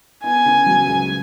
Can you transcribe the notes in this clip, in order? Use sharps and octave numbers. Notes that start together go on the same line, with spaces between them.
B3 G#5
C#3
F#3
C#2